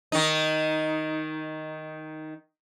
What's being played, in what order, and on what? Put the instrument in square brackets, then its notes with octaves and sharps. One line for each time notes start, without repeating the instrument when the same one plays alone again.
[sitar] D#3 D#4